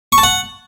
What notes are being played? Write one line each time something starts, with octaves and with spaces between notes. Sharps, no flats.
C#6
A5
F#5